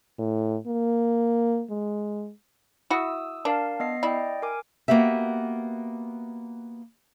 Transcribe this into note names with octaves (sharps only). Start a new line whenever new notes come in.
A2
A#3
G#3
E4 F#4 D#6 E6
D4 A#4 F5 A5
B3 D#5 C7
E4 D5 D#5 G5
A#4 G#5 D6
A#3 B3 F#4 G4 E5